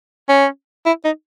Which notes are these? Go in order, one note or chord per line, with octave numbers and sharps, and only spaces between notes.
C#4
E4
D#4